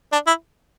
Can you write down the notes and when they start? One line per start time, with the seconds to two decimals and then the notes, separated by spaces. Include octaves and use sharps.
0.13 D4
0.27 E4